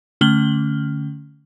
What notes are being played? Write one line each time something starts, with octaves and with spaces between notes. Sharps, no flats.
D3 A3 C#4 F6 F#7 G7